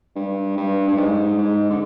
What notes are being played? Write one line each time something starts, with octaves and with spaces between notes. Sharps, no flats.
G2
G2
G2
G#2
G#2
D3